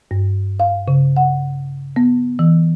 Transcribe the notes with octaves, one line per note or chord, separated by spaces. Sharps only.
G2
F5
C#3
F#5
B3
E3